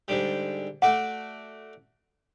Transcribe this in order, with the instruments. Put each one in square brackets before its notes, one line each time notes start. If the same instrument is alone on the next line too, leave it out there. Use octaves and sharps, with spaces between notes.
[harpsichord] G#2 D3 G3
[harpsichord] A3 F#4 D5 [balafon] F#5